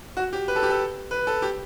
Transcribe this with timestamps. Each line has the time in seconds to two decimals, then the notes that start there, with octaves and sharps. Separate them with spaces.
0.17 F#4
0.33 G4
0.48 B4
0.56 A4
0.63 G4
0.70 A4
1.11 B4
1.27 A4
1.42 G4